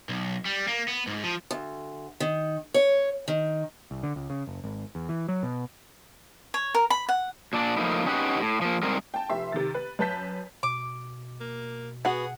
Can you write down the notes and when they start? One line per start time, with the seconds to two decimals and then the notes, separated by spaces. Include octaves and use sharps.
0.09 B1
0.46 G3
0.68 A#3
0.88 B3
1.07 G#2
1.23 F3
1.51 D2
2.20 D#3
2.74 C#5
3.28 D#3
3.91 C2
4.03 D3
4.16 C#2
4.30 C#3
4.47 F#1
4.64 G#1
4.95 E2
5.09 E3
5.28 F#3
5.43 B2
6.54 C#5
6.74 A#4
6.90 B5
7.08 F#5
7.53 A#2 D4 D5
7.77 A2 F3 F#3 A#3 D#4 E4
8.06 C#4 D#4 G4 B4 F5 F#5
8.40 A2
8.61 F3 A#3
8.83 G#2 G3 C4 A#4
9.14 G5 A5
9.29 F1 G4 E5 C6
9.52 C3 D#3 A6
9.74 B4
9.99 F#2 B4 A5 G6 B6
10.63 B2 D6
11.41 A#3
12.05 B3 F#4 G#4 F#5